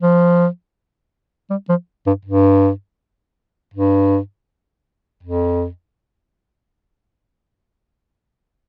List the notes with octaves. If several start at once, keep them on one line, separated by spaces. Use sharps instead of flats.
F3
G3
F3
G2
G2
G2
F2